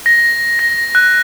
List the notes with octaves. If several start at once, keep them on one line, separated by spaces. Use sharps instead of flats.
A#6
A#6
F#6